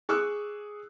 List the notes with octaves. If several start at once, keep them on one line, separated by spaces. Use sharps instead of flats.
G#4 C#6 D6 E6 F#6